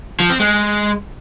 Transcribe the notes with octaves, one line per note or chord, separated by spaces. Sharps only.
F3
C4
G#3